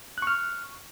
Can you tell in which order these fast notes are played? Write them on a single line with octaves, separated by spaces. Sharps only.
F#6 C#6 F6